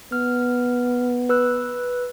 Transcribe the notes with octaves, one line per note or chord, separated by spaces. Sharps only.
B3 F6
B4 E6 F#6